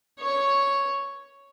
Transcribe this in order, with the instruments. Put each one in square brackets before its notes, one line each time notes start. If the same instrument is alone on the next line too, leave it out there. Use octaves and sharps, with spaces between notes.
[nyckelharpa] C#5